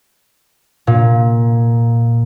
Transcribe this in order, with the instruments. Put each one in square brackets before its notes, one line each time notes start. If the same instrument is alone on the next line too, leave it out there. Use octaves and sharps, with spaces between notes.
[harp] A#2